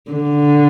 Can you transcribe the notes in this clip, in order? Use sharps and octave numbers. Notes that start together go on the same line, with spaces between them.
D3